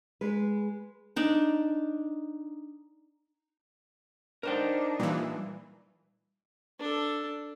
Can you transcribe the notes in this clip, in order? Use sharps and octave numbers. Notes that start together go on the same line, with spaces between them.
G#3 B4
D4 D#4
D4 D#4 A#4 C5 G5
A#2 E3 G3
D4 A4